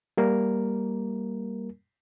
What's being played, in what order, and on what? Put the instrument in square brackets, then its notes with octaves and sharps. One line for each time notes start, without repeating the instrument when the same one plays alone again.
[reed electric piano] G3 A#3 A#4